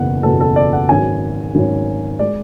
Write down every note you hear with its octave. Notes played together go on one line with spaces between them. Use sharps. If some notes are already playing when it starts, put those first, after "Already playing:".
Already playing: F#1 E2 B2 F#5
F#1 E2 B2 A4
A4
D5
F#5
G#1 G#2 F#3 C#4 G#5
G#1 G#2 F#3 C#4
G#3 D5